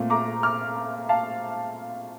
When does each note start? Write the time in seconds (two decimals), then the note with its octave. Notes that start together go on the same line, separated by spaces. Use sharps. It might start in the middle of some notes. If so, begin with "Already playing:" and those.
Already playing: A#2 A3 C4
0.10 A#5 D6
0.43 D6 F6
1.09 F5 A5